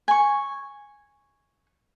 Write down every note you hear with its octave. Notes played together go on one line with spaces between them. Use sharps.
G#5 C#6